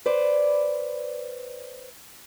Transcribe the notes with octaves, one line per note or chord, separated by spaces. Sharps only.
B4 C5 D5